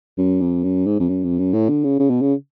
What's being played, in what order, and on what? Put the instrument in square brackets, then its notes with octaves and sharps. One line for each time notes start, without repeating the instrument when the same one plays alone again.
[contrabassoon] F#2
F2
F#2
G#2
F2
F#2
F2
F#2
A2
D3
C#3
C#3
B2
C#3